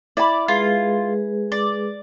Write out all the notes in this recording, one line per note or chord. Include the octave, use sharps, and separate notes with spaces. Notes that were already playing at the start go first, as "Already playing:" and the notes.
E4 D5 B5
G#3 F4 G#4 B4
D5